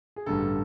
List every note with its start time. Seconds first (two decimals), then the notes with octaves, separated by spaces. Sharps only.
0.16 G#4
0.26 A1 G2 D3 A4